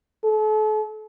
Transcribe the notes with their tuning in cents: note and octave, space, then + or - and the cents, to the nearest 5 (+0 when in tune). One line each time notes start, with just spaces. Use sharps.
A4 -40